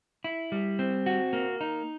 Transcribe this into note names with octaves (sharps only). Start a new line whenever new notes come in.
E4
G3
C4
F#4
A#3
D#4